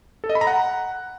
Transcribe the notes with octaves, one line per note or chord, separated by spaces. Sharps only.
A4
D#5
B5
A#5
F#5